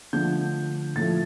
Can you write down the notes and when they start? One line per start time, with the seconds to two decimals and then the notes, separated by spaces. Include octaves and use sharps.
0.13 D3 F3 A3 G6
0.96 A2 F3 A3 A6